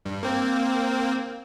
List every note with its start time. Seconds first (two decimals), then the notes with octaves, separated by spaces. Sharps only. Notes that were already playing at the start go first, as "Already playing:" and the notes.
0.05 G2
0.23 A#3 C4